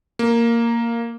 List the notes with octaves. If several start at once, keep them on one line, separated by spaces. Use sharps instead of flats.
A#3